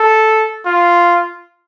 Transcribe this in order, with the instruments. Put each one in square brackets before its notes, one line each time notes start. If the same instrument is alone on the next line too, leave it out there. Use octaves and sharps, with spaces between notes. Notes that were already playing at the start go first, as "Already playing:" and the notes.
Already playing: [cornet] A4
F4